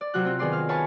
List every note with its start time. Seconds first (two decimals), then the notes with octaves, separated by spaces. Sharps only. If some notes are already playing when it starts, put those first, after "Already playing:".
0.01 D5
0.14 C3 F#3 F4 F#4 F#6
0.25 C4 F4
0.39 D#3 B3 G#4 D5 C6
0.52 F5 F6
0.69 B4 C#5 F5 G#5 A5 C#6